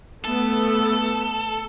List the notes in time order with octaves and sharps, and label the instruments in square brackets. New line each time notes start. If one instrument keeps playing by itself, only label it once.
[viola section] A3 B3 [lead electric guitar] A4